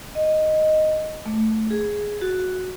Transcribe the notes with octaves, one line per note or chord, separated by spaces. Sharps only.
D#5
A3
G#4
F#4